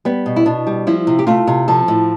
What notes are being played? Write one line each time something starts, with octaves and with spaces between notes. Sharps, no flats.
G3 B3
B2
E4
B2 D4
G3
F3 E4
C3
G4
A3 F4
C3
F3 A4
A2